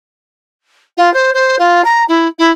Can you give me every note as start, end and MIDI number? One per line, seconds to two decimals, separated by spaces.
0.97 1.12 65
1.13 1.30 72
1.34 1.56 72
1.59 1.81 65
1.84 2.03 82
2.08 2.27 64
2.38 2.50 64